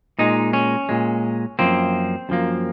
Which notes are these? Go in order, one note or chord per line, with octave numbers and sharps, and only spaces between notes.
A#2 G#3 D#4
C#4
A#2 G#3
F#2 F3 A#3 C4
F#2 F3 A#3